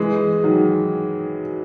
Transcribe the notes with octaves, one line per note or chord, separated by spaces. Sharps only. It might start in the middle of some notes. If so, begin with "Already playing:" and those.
Already playing: E3 G#3
D#3 F#3